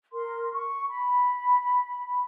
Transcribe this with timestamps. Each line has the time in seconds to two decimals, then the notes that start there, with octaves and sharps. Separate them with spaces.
0.13 A#4 C6
0.53 C#6
0.90 B5